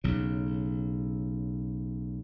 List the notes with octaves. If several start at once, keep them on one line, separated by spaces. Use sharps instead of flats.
B1 C#3